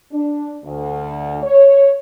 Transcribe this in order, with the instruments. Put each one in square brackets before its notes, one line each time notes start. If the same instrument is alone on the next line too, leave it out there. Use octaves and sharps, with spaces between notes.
[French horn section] D4
D2
C#5